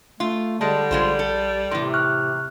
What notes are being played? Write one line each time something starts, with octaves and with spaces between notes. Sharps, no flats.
A3 F4
D3 G3 G#3 A5
A#1 G#3 F4 C5
A4
A2 C3 E3 C6
C#6 F6 F#6